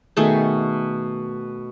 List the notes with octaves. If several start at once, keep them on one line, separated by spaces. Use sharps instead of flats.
B2 D#3 A3 G#4